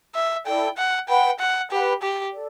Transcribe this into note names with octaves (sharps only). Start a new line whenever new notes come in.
E5
E4 A4 D5 G5
F#5
B4 F#5 G5 B5
F#5
G4 B4 F#5 B5
G4
A4 D5